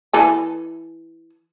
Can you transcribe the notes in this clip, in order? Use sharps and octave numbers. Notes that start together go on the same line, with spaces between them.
E3 A4 G#5